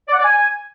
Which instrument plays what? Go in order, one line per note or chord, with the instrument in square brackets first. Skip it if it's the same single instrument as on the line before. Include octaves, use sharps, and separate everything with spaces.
[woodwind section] D5
F#5
D5
G#5